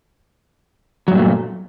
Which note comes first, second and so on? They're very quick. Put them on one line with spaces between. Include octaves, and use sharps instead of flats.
F#3 G2 A#2 A3